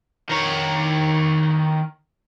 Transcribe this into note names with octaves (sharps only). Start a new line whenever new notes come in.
D#3 C#5